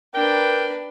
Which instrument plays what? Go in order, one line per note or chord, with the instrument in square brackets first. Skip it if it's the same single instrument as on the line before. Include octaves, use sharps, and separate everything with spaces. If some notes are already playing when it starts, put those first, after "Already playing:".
[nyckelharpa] D4 B4 [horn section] A#4 G5